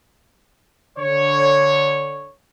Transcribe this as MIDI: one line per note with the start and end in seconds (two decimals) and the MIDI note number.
0.98 2.33 50
0.98 2.33 73